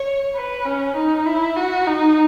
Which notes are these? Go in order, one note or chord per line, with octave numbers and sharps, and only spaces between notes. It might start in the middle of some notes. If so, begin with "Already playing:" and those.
Already playing: C#5
B4
C#4
D#4
E4
F#4
D#4